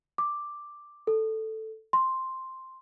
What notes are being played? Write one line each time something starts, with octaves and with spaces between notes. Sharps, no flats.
D6
A4
C6